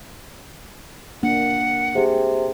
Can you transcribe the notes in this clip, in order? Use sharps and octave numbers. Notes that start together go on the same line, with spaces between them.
A#3 D4 F#5
C3 G4 G#4